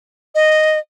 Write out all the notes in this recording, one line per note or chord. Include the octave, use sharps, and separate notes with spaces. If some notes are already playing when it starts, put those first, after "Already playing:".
D#5